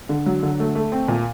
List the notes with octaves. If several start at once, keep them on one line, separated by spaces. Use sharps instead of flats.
D3
F#3
D3
A3
A3
C4
A#2